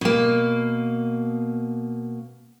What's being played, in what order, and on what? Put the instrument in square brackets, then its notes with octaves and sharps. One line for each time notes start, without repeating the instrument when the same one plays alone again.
[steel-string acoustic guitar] B2 A#3